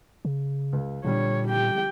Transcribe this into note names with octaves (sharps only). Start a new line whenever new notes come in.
C#3
C#2
A#2 D3 G3 C#5
G4 G5